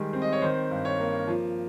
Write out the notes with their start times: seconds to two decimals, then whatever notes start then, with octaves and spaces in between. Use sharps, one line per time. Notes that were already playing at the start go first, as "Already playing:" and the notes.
Already playing: D#3 G3 G#3
0.13 C4
0.22 D#5
0.33 C#5
0.42 D#3 C5
0.71 G2
0.85 C#5
1.00 A#3
1.27 F3